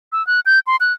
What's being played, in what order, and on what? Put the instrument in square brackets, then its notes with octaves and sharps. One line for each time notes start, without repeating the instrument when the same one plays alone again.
[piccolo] E6
F#6
G6
C6
F#6